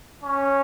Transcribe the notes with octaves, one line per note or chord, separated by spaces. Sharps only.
C#4